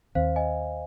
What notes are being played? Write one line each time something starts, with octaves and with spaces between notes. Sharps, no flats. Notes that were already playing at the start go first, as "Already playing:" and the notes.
D#2 D#3 C4 C5 F5
D#5 G#5